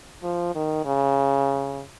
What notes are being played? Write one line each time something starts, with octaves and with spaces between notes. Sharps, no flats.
F3
D#3
C#3